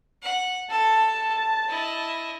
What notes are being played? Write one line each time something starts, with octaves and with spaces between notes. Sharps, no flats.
F#5
A4 A5
E4 D#5